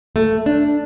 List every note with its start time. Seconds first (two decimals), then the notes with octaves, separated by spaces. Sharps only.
0.16 A3
0.46 D4